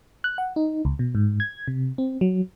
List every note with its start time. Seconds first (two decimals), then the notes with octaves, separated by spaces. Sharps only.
0.24 F#6
0.38 F#5
0.56 D#4
0.85 C#2
0.99 B2
1.15 G#2
1.40 G#6
1.68 C3
1.98 C4
2.21 F#3